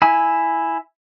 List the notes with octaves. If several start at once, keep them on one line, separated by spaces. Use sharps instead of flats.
E4 G#5 E6